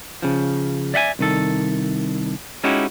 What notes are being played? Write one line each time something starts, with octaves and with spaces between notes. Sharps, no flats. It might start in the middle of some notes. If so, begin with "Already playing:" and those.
C#3 F3
D5 E5 F#5 G#5
C2 D#3 A4
G#3 C#4 D#4 E4 F#4 G4